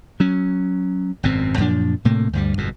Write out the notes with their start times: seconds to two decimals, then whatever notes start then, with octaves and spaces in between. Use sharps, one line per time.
0.20 F#3 C#4
1.23 G#1 F#2 B2 C4
1.57 F#2 A#2 F3 D4
2.05 A2 C3 A3 A#3
2.33 D2 G2 G3
2.58 G1 F2 G#2 B2